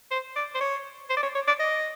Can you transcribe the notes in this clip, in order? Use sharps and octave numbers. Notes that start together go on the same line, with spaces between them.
C5
D5
C5
C#5
C5
D5
C#5
C#5
D5
D#5